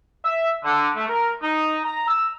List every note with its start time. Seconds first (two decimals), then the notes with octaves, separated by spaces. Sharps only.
0.25 E5
0.64 D3
0.95 A3
1.08 A#4
1.42 D#4
1.85 A#5
2.07 E6